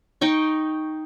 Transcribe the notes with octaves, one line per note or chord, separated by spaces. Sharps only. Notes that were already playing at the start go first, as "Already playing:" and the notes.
D#4 G5 C#6